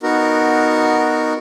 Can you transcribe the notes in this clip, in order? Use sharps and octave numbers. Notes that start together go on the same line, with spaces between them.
B3 D#4 F#4 A#4